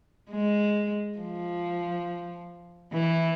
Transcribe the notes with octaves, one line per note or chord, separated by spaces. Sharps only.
G#3
F3
E3